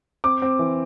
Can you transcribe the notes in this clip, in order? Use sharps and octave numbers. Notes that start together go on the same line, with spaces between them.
C4 D6
C4
E3